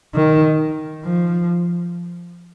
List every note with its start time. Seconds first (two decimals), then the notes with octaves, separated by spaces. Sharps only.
0.15 D#3
1.05 F3